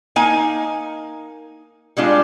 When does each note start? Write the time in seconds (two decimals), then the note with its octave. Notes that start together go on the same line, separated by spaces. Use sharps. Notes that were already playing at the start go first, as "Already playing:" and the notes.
0.16 A#3 D#4 G#5
1.97 G3 G#3 D4 F4